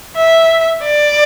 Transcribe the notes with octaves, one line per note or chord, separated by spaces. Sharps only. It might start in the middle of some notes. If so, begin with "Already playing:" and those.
E5
D5